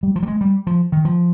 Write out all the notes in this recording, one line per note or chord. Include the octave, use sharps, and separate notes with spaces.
G3
F3
G3
G#3
G3
F3
D#3
F3